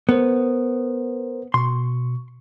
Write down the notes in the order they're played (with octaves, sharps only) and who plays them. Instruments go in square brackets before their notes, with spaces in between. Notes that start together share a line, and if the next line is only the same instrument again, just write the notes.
[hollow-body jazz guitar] B3 [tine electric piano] A#4 C5
[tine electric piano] B2 C#6 [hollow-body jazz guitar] C6